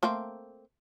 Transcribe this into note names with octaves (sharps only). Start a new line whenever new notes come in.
A3 A#3 C4